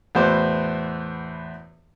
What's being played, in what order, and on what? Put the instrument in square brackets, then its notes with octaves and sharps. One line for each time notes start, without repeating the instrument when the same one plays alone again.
[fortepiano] E2 A2 B3 F#4 C5 D6